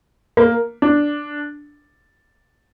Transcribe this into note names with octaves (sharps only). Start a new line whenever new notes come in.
A#3
D4